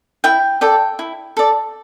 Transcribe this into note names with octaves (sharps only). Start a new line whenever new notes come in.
E4 G5
A4 D5 G5
E4
A4 D5